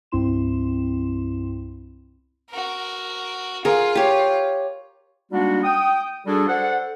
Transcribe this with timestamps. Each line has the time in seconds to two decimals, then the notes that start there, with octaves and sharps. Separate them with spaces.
0.12 C2 G2 C4 E4 C6 E7
2.50 F#4 A#4
3.65 F4 G#4 A#4
3.95 G4 C#5
5.31 G3 G#3 A#3 D4 D#4 F#4
5.63 G5 D#6
6.26 G3 D4 F#4 G#4 A4
6.48 A4 C5 D5 F#5